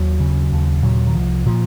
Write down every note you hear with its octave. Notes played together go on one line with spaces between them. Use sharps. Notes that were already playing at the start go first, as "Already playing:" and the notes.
Already playing: D#2 F#3
C#3
D#2
A#2 F#3
D#3
C2 F3
A#2 F3